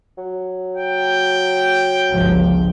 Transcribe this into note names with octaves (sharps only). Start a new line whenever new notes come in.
F#3
G5
G1 C#2 F3